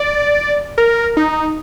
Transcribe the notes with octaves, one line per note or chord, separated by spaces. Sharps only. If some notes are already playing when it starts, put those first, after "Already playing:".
Already playing: D5
A#4
D#4